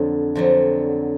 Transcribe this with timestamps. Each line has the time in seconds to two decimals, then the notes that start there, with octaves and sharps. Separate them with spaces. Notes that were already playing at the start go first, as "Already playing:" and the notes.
Already playing: F2 D3 F#3
0.35 F2 D3 F#3